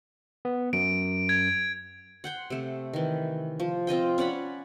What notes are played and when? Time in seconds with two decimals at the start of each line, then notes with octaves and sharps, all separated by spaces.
0.45 B3
0.73 F#2 D7
1.29 G#6
2.24 F#5 G5 C6
2.50 C3 A3
2.94 D#3 E3
3.60 F3
3.87 C4 F4 D#5 G5
4.18 C#4 D5 F#5 B5